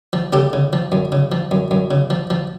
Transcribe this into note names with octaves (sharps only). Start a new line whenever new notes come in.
F3
C#3 G4 A4
C#3
F3
F#2
C#3
F3
F#2
F#2
C#3
F3
F3